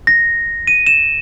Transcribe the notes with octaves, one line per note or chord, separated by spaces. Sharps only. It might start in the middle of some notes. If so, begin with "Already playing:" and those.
A#6
D#7
E7